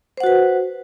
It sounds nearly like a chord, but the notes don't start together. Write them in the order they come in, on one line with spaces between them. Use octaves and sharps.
C5 F#5 F#4 B4